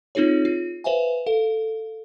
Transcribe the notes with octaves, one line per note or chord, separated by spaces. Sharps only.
C4 D#4 F4 G#4 C#5
F4
B4 C5 E5 F5 G#5
A4 F5